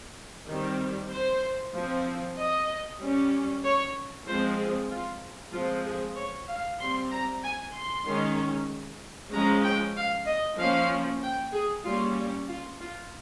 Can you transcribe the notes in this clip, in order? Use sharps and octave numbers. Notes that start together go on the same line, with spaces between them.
D#3 G3 C4
C5
F3 C4
D#5
G3 C#4
C#5
F3 G#3 C4 C5
G#4
F4
F3 G#3 C4 F4
G#4
C#5
F5
G3 C4 C6
A#5
G#5
C6
D#3 G#3 C#4
F3 G#3 C#4 A#5
G5
F5
D#5
F3 A#3 C#4 F5
G5
G#4
G3 A#3 C#4 F4
F4
F4